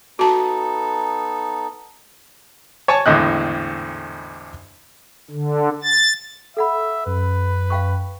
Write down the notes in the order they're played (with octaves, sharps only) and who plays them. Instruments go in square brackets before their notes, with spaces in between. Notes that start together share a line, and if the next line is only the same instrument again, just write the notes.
[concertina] B3 D#4 A4 [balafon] F#4 A5
[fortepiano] C#5 G#5 A5 C#6
G#1 E2 A2 D3 D#5 F#6
[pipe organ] D3
A6
[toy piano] A4 F#5 B5 [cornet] E5
[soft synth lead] F#2 [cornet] B4
[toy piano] F5 G5 C#6